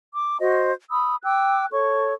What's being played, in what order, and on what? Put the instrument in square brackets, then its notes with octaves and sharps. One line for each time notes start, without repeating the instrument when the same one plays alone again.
[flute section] D6
F#4 C5 D#5
B5 D#6 E6
G5 D6 E6 F#6
A4 C#5 C#6